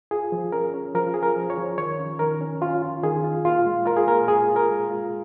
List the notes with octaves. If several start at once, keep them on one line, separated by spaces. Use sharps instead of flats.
F4 G#4
F3
C#4 A#4
C#4
F3 A#4
F4 G#4
A#4
F3
C#5
F3
D#3 C#5
C#4
D#3 A#4
C#4
C#4 F4
F4
D#3 G#4
F4
A#2 F4
G#3
F4 A#4
G#4
A#2 A#4
F4 G#4
F4
A#4
G#3
F4